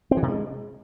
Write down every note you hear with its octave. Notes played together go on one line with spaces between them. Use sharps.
C4
E3
C3
G#3